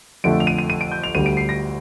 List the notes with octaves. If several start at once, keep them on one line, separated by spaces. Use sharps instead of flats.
F2 D3 A3 D7
F7
D#7
D#7
D#7
D7
G6
F7
D2 D3 G3 D#7
D7
C7
A#6